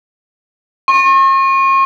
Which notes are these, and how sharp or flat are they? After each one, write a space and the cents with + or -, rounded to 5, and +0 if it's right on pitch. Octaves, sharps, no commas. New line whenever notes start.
C#6 -45